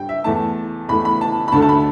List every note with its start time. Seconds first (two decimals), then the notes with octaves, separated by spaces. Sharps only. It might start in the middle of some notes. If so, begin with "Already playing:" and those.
Already playing: G2 G3 G5
0.09 E5
0.24 E2 E3 A3 A5
0.88 E2 E3 A3 B5
1.05 B5
1.21 A5
1.48 B5
1.52 D2 D3 A3 A5
1.62 A5
1.69 B5